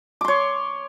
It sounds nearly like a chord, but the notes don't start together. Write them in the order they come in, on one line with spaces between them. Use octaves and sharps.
D6 C6 C#5